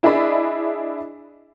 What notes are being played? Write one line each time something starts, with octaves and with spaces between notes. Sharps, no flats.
D4 E4 G#4 D5 D#5 B5